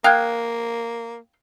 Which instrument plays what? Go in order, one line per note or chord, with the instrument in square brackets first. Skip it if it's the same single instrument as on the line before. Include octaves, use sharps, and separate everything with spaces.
[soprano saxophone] A#3 [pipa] F5 G5 [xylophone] D#6 F#6 G#6